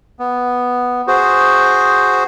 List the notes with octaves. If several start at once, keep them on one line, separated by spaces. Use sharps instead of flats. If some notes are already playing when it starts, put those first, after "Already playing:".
B3
F#4 G#4 C5